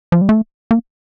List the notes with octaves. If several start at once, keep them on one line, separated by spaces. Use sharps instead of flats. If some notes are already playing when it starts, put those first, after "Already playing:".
F3
G3
A3
A#3